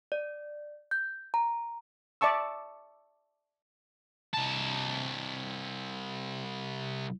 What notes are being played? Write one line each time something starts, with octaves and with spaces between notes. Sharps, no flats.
D5
G6
A#5
D5 E5 A5 C#6 E6
C2 A5